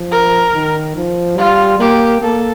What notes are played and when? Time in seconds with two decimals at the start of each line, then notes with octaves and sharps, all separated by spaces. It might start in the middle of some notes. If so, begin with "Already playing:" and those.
Already playing: F3
0.11 A#4
0.54 D#3
0.96 F3
1.38 G3 F4
1.79 A#3 G4
2.21 A#3 A4